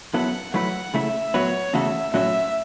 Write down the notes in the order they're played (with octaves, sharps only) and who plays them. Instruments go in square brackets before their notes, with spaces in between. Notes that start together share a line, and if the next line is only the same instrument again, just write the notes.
[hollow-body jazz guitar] F#2 F#3 B3 E4 A4 [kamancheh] F#5
[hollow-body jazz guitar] F#3 A3 E4 B4 [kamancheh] F#5
[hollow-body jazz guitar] C#3 A3 E4 [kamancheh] E5
[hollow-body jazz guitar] A2 F#3 B3 F#4 B4 [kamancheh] C#5
[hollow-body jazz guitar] E2 C#3 A3 F#4 A4 [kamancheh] E5
[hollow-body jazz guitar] A2 F#3 C#4 F#4 [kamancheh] E5